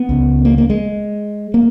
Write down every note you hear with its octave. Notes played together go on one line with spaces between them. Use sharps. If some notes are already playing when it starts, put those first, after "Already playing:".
Already playing: B3
C#2 C#3
A#3
A#3
G#3
A#3